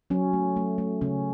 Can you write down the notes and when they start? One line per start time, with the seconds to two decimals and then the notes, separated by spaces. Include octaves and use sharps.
0.10 F#3 C#4
0.33 A3
0.56 A3
0.78 A3
1.01 C#3 C#4